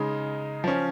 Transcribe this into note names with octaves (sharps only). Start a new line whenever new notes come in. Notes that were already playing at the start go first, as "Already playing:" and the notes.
Already playing: C#3 G#3 D#4
F3 C#4